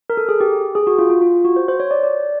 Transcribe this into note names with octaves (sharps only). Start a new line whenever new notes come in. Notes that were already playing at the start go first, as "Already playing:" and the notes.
A#4
A4
G#4
G4
G#4
F#4
F4
F4
F4
F#4
C5
C5
C#5
D5
D5